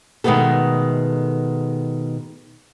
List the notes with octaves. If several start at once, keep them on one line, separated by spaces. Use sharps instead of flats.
B2 D#3 G#3 A3 B3 A4